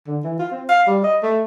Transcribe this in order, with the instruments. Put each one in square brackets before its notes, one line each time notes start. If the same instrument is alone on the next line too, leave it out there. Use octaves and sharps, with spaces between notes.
[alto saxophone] D3
E3
F4
C4
F5
G3
D#5
A3